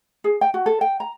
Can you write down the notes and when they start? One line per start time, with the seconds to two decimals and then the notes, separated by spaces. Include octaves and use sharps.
0.24 G#4
0.41 G5
0.54 F#4
0.66 A4
0.81 G5
1.00 A#5